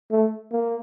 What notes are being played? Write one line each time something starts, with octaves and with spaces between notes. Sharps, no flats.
A3
A#3